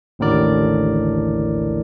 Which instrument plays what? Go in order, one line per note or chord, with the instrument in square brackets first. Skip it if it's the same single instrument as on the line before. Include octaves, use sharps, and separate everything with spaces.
[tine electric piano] A1 D#2 A2 D3 A#4 D5